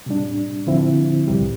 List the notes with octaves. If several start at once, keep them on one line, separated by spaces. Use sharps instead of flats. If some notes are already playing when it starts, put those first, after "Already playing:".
C3 G3 D4
D3 F3 C4 E4
C2 C3 G3